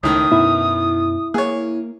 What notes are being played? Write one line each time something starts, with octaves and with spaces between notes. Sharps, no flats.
C#2 A2 D#3 D#6
F#2 B2 B3 E4
A#3 G#4 C#5